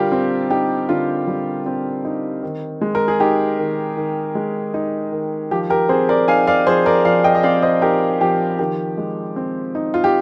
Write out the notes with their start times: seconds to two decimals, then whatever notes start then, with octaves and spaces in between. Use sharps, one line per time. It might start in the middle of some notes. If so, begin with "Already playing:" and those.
Already playing: D3 G3 F4 G4 A#4 D5
0.12 C4
0.50 D#4 G4
0.89 D3 F4
1.27 G3
1.66 C4
2.05 D#4
2.43 D#3
2.81 G#3
2.95 A#4
3.08 G#4
3.20 D#4 G4
3.59 D#3
3.97 D#3
4.35 G#3
4.74 D#4
5.12 D#3
5.51 F3 G4
5.70 G4 A#4
5.89 C4 G#4 C5
6.09 A#4 D5
6.28 D#4 F5 G#5
6.47 D5 F5
6.66 F3 G#4 C5
6.86 A#4 D5
7.05 F3 D5 F5
7.24 D#5 G5
7.35 D#5
7.43 C4 D5 F5
7.62 C5 D#5
7.82 D#4 G4 A#4
8.21 F3 G4
8.59 D#3 G4
8.98 G#3
9.36 C4
9.75 D#4
9.94 F4
10.04 G4